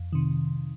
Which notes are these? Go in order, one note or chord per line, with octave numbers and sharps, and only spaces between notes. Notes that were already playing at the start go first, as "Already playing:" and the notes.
Already playing: F2
C3 D#3